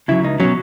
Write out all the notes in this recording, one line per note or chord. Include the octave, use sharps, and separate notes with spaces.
C#3 F#3 E4
C#2 D#4
B2 F#3 C#4